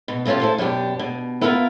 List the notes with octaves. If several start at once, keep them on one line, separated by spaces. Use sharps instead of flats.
B2
B2 A3 C#4 F4 G4
E4 A4 C5
F#2 B2 D4 G4
B2
B3 E4 F4 A#4 F5